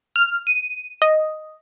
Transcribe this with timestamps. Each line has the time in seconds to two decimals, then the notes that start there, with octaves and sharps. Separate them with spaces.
0.16 F6
0.47 D#7
1.02 D#5